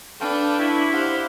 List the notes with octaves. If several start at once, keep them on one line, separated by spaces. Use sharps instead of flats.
D4 A4 B4 F5 G5
E4 C#6
G4 C5 F5 F#5